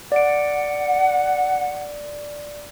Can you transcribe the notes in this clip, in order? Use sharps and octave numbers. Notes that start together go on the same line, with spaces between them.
D5 F#5 D7